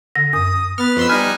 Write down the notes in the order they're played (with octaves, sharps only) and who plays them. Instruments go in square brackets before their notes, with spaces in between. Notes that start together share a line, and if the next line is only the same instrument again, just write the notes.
[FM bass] D3 [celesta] A#6
[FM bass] F#2 [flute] D#6
[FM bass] B3 [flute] B4 [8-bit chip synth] F6 A6
[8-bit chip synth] F2 C6 E6
[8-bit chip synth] G3 D#4 G#5 [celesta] F6 F#6